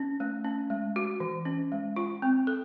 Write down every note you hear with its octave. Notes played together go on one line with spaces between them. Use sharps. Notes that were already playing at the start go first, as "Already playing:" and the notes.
Already playing: C#4
A3
C#4
G#3
F#4
E3
C#4
G#3
F4
C4
A4